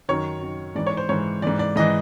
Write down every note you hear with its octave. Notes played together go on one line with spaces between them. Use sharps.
F#2 D#3 C#5
F#2 D#3
G#2 E3 D5
C#5
C5
G#2 E3 C#5
G#2 E3 D5
D5
G#2 E3 D#5